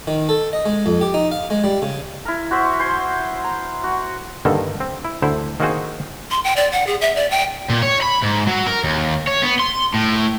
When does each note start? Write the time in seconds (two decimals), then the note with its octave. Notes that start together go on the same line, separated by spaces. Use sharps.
0.07 D#3
0.29 A4
0.53 D#5
0.66 G#3
0.86 F2
1.01 G4
1.14 D#4
1.32 F5
1.50 G#3
1.64 G3
1.82 C#3
2.25 E4 A#4
2.51 F#4 C5 E5
2.79 C5 G#5 C6
3.44 A#5
3.84 F#4
4.45 G2 D3 D#3 A#3 A4
4.80 C4
5.05 E4
5.22 D2 D3 E4 C5
5.60 D#3 A#3 C4 F#4 G#4 C5
6.31 C6
6.44 G5
6.57 D5
6.72 F#5
6.87 G#4
7.01 E5
7.16 D5
7.31 G5
7.70 A#2
7.82 C#5
8.02 B5
8.22 G#2
8.47 F#3
8.67 A#4
8.84 D#2
9.27 C#5
9.42 B3
9.60 C6
9.94 A2